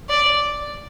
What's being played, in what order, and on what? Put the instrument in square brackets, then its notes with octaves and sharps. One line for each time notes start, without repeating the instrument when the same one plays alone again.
[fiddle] D5